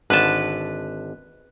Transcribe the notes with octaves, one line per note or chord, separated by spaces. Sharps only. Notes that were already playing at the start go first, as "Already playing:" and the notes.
G#1 D3 B4 A5